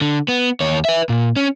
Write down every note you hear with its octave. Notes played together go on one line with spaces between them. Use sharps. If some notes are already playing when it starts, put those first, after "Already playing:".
D3
B3
D#2 C#5
B4 E5
A#2
C#4